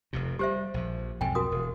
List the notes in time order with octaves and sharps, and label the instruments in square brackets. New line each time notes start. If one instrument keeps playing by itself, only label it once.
[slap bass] F1 F2 C3
[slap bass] G3 [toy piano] G4 C5 E5
[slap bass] A#1 F3
[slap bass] B1 F2 G#2 [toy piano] G5 G#5
[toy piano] F#4 A#4 D#6
[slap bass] E1